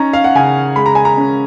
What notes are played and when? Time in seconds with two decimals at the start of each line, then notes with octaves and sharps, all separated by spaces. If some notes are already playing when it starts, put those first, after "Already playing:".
Already playing: C#4 D#4 A#5
0.13 F5
0.24 F#5
0.35 C#3 G#5
0.76 G#3 B5
0.86 A#5
0.95 G#5
1.05 A#5
1.17 C#4